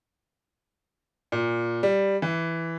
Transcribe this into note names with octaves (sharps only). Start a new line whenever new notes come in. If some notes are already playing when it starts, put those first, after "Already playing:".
A#2
G3
E3